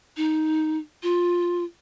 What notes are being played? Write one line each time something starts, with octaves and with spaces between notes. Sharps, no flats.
D#4
F4